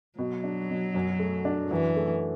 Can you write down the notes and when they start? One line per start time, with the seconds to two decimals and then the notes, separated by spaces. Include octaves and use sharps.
0.19 B2 F#3
0.44 D4
0.70 B2
0.95 F#2
1.19 A3
1.45 D4
1.71 F#2 E3
1.96 A3